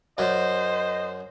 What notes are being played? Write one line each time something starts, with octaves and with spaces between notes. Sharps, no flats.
F#2 C5 D#5